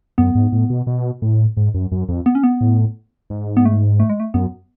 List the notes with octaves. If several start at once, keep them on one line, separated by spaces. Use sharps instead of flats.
F#2 B3
G#2
A2
B2
B2
A2
G#2
F#2
F#2
F2
B3
C#4
B3
A2
G#2
B3
A3
A3
G#3
A3
F#2 B3